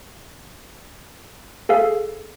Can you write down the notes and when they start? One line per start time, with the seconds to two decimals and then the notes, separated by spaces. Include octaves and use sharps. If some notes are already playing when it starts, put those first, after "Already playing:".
1.69 G#4 A4 F5